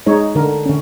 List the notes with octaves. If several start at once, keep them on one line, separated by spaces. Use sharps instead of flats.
G#3 D#4 C#5
D3 A#4
D3 C#4